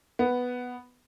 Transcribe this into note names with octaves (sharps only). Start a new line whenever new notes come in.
B3